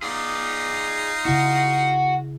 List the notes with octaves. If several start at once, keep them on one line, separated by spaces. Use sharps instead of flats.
D#4 F4 G#4 D5
C#3 E4 F#4